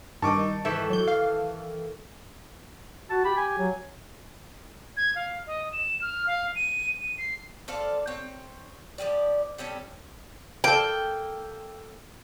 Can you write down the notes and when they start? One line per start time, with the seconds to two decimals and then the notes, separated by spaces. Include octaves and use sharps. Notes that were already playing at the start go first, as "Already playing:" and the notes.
0.22 G2 D#3 E3 D#4 A5 C#6 D6
0.65 G#2 D#3 E3 A4 E5
0.90 F#3 G6
1.08 F5
3.10 F#4 A5
3.25 G4 B5
3.37 G#5
3.58 F#3
4.97 G#6
5.15 F5
5.47 D#5
5.73 E7
6.01 F6
6.27 F5
6.55 D#7
7.00 D#7
7.18 C7
7.68 A4 C5 D5 F5
8.07 C4 C#5
8.98 F3 F#3 G4 D5
9.58 G3 C4 C#4 A4
10.64 A#3 A4 G5